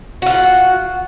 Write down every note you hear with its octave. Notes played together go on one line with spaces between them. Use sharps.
F4 F#4 F#5